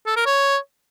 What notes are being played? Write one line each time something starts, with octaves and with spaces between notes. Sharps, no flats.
A4
A#4
C#5